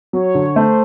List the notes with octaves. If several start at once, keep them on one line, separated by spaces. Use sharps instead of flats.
F#3 C#5
D3
A3 C5